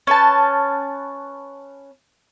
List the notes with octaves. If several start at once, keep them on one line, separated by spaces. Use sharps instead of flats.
C#4 B4 A5